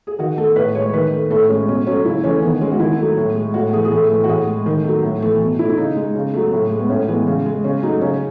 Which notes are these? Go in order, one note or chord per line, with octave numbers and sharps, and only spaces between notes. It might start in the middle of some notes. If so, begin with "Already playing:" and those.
G#4
D#3 F#4
A3 A4
A2 B4
G#3 C#5
D#3 B4
A3
A2 A4
G#3 C#4
B2 C#4
F#3 A3 C#4
C#3 E4
E3 A3 C#4
D#3 B3
G#3 C#4
F#4
D#3 E4
F#3 A3
A2
G#3
A2 F#4
E3 A3 G#4
G#4
A2 A4
E3 A3
F#4
A2 G#4
G#3
D#3
F#3 A3
A2
E3 A3
B2
A3 E4
E4
C#3 D#4
G#3
C#3
F#3 A3
A2
G#3
B3
A2 C#4
E3 G#3 B3
C#3
G#3
C#3 C#4
F#3 A3 D#4
C#3 C#4